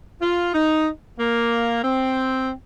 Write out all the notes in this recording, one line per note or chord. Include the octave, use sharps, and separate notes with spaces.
F4
D#4
A#3
C4